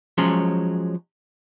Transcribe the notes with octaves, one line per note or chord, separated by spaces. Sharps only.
F3 F#3 G#3 C#4